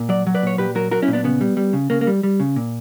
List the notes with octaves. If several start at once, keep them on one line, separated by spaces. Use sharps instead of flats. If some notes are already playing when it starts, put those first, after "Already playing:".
Already playing: A#2
F#3 D5
F#3
B4 D5
A#2 C#5
A#2 G4 B4
F#3 F#4 A#4
F#3 F#4 A#4
C#4 E4
A#2
B3 D4
C#3 B3
G3
G3
C#3
C#3 A#3
A#3
G3
G3
C#3
A#2